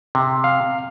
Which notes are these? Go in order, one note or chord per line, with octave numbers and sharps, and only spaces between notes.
C3
F5